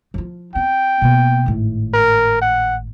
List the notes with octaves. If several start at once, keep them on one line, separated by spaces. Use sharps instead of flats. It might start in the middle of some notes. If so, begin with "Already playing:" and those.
F3 F4
C4 G5
B2 A#3
G#1 A2
A#4
F#5